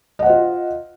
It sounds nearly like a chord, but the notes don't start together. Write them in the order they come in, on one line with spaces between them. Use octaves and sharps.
D#5 F#5 C5 F4